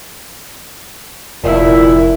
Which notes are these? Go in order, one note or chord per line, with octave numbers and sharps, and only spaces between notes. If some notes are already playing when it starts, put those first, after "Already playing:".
F1 A#2 E4